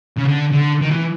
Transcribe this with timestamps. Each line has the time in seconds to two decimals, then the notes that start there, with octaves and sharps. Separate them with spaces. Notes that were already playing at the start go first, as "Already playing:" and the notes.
0.17 C#3
0.25 D3
0.52 D3
0.81 D#3
0.91 E3